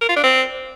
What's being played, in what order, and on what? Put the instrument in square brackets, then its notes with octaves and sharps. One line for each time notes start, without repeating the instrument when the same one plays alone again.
[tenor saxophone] A#4
F4
D4
C4